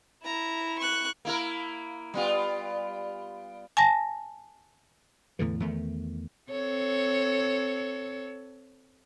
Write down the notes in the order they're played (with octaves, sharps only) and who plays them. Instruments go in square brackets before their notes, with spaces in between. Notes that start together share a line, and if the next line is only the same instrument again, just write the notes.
[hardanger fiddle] E4 [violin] A#5
[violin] C#6 F#6
[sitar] A#3 E4 A#4
G3 B3 F4
[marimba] G#5 A5 A#6
[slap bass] E2 A2 D3 E3
E2 D#3 A3
[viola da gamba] C4 A4 C#5